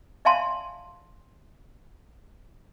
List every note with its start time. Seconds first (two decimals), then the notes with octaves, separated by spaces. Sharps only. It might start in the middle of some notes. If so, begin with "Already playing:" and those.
0.25 D5 E5 F5 G#5 A5 C6